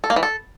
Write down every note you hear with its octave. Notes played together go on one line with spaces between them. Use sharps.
A4
A#3
E3
A4